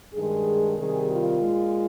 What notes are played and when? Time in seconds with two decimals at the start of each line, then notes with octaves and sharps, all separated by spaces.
0.13 G2 D#3 G#3 G#4
0.77 C3 D#3 G3 G#4
1.09 F4
1.40 A#2 G#3